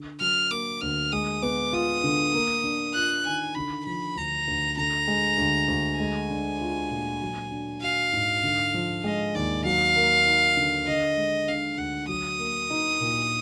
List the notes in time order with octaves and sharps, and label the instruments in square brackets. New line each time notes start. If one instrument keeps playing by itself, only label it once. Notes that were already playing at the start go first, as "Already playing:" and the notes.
Already playing: [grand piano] D3
[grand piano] F#3 [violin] F6
[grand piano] A#3 [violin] D6
[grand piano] D2 [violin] F6
[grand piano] G#3 [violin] D#6
[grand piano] B3 [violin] D6
[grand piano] F4 [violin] D#6
[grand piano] D3
A#3
D4
[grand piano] F4 [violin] F#6
[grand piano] D#3 [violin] G#5
[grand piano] D3 [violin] B5
[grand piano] F3 [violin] B5
[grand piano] D2 [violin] A#5
[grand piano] D2
[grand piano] D3 [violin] A#5
[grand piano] G#3
D2
D2
[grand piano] G#3 [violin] G#5
[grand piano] D4
F4
A#2
F#3
D4
[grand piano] F#4 [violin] F5
[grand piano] G#2
D3
F3
[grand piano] G#3 [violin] D#5
[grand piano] D#2 [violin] D5
[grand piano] F#3 [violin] F5
[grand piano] A#3
D#4
D3
[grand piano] D3 [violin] D#5
[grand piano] G#3
[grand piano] D4 [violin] F5
[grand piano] D2 [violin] F#5
[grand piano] F#3 [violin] D#6
[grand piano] A#3
D#4
A#2